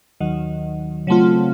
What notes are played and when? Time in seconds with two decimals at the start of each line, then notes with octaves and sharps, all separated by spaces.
0.20 D#2 D#3 F#3
1.07 C#3 F#3 A3 C4 F4